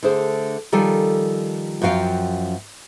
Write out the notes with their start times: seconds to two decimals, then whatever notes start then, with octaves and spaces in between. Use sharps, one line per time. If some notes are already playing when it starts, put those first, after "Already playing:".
0.03 D3 A3 G#4 C5
0.72 D#3 F3 G3 A4 G#5
1.82 F#2 F3 F#4 F5 G5